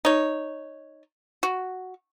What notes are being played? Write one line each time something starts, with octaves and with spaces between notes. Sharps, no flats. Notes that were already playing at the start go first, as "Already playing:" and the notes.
D#4 C#5
F#4